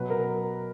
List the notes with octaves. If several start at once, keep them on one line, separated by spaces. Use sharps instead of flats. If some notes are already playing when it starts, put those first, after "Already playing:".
Already playing: B2 F#3 B4
A#4